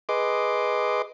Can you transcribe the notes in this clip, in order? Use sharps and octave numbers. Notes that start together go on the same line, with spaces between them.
G#4 B4 D#5 C6 D6